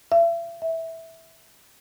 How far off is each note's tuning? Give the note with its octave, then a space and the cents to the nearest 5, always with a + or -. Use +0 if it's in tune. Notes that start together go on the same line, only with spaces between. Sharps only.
E5 +40
E5 -10